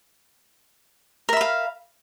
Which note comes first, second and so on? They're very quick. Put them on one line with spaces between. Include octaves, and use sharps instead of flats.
A#4 E5 B5 F5